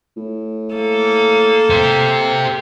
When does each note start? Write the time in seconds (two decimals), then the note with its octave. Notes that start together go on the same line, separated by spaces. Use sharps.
0.17 A2
0.74 A#3 A4
1.70 G4 C5